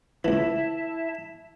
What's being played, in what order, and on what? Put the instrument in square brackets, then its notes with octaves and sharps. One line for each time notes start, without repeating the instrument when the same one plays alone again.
[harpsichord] C#2 E3 [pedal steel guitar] E4 [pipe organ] E5 A5